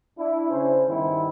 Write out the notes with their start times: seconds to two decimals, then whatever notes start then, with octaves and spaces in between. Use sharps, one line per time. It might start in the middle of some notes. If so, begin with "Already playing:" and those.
0.18 D4 E4
0.50 C#3 C#4 C5
0.88 G2 D#3 B3 E4